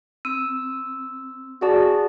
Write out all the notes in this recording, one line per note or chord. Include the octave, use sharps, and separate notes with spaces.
C4 E6
F#4 G#4 D5 A5